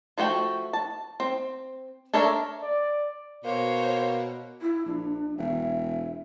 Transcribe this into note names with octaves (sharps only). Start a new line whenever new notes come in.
F3 A3 F#4 G5
A5
C4
D4 A4 A#4 C#5 E5
D5
B2 A#3 C5 C#5
E4
A#1 D4
E1 E5